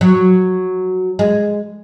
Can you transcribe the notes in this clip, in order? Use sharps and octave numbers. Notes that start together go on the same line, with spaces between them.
F#3
G#3